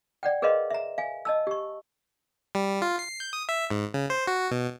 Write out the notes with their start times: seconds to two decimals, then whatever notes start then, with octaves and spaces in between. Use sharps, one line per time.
0.23 D5 F#5 G5
0.42 G#4 A#4 B4 D#5 F5 C6
0.71 E5 A#5
0.98 F5 G#5
1.25 D#5 A5 E6
1.47 G4 C#6
2.55 G3
2.82 F4
2.99 C7
3.20 G6
3.33 D#6
3.49 E5
3.70 G#2
3.94 C#3
4.10 C5
4.27 F#4
4.51 B2